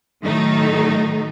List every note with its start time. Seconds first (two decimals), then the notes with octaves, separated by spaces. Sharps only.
0.23 A2 D#3 F#3 A3 D#4